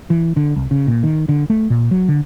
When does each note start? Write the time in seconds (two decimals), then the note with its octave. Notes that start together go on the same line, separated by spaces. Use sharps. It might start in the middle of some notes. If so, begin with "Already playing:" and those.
0.10 E3
0.36 D3
0.56 C2
0.71 C#3
0.87 A#2
1.03 D#3
1.29 D3
1.50 A3
1.70 A#2
1.91 F#3
2.09 D3